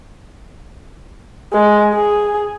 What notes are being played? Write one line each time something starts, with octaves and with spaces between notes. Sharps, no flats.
G#3
G#4